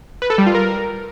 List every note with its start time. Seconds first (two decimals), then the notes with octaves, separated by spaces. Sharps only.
0.22 B4
0.30 A4
0.38 G3
0.46 F4
0.55 A#4